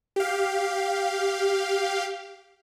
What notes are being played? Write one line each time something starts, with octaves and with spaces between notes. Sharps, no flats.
G4 F5